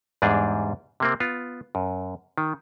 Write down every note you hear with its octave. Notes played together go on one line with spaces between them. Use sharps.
E2 G#2 G3 D4 G#4
C3 A#3 C4
B3 F4
F#2
D#3